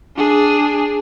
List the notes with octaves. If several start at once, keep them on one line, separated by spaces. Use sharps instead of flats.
D4 G#4